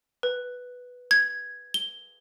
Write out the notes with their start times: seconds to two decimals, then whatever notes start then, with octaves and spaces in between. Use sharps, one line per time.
0.23 B4
1.11 G#6
1.74 G7